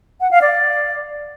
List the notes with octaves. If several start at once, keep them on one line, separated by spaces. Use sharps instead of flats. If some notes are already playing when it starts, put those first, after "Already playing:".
F#5
F5
D5